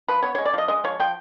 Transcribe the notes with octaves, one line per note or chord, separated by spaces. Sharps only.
F3 B4
B3 C#5
C#5
G#3
D5
F3 D#5
G#3 D#5
F3 C#5
F3 G5